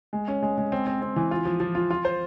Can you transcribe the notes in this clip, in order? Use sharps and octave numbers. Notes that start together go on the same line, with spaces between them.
G#3
C#4
G#3
G#3
C4
C4
C4
E3
F4
F3
F3
F4
F4
C5